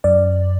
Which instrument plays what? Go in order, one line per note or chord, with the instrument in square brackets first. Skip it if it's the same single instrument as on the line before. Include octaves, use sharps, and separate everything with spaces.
[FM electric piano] F#2 D5